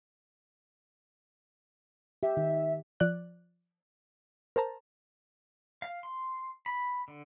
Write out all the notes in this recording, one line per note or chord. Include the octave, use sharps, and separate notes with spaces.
G4 E5
D#3 D#4
F3 D5 F#6
A#4 C5 A5 A#5
F5
C6
B5
D3